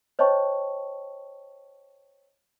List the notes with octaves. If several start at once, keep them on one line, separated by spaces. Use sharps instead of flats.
C5 C#5 D#5 G5 A5 C#6